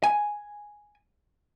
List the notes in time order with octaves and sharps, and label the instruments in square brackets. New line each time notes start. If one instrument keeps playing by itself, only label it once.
[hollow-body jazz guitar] G#5